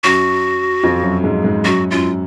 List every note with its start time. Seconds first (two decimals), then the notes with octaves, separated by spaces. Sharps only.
0.04 F#2 F#3 F#4
0.83 F2 F3
1.04 F#2 F#3
1.24 G#2 G#3
1.44 G#2 G#3
1.64 F#2 F#3 F#4
1.91 F#2 F#3 F4